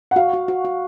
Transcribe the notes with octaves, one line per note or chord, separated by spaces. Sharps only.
F#5
F#4 F5
F#4
F#4
F#4